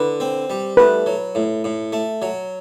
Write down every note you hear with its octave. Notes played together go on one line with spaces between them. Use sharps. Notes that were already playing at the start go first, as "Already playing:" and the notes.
Already playing: D3 B4
C4
G3
A3 B4
F#3
A2
A2
A3
F#3